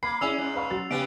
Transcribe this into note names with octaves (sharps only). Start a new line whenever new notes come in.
A#3 B5 C7
C#4 E4 G#4 D5 E6 F7
G#2
B4 F5 C#6
F#3 F#4 A6
C#3 B3 C#4 G4 D7